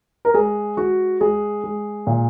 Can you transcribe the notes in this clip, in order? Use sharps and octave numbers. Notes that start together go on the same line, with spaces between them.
A#4
G#3 G#4
G#3 F#4
G#3 G#4
G#3
A#2